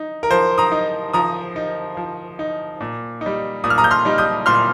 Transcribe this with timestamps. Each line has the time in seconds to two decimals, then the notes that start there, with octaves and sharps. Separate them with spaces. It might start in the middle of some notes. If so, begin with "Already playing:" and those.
Already playing: D#4
0.23 A#4
0.30 F3 C5
0.58 A#5 D#6
0.72 D#4
1.13 F3 A#5 D#6
1.56 D#4
1.97 F3
2.39 D#4
2.81 A#2
3.21 D#4
3.26 G3
3.64 A#2 D#6
3.70 F6
3.78 A#5 D#6
3.84 G6
3.91 C6 F6
4.05 G3 D#4
4.18 D#6 G6
4.46 A#2 C6 F6